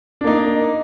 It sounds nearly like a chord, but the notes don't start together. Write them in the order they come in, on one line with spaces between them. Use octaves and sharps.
D4 A#3 D#4